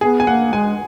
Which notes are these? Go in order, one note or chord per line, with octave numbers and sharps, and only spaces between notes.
B3 G#4
G#5
A#3 F#5
G#3 G#5